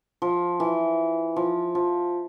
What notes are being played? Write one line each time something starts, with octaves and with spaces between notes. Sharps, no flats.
F3
E3
F3
F3